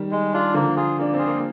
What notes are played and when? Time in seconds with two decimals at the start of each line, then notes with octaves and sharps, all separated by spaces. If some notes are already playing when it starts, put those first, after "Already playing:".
Already playing: D#3 G3
0.11 G#3
0.33 D4 F4
0.54 D3 F3 A#3
0.76 F4 G#4
0.97 A#3 D4
1.14 C4 F4 G#4
1.27 A#3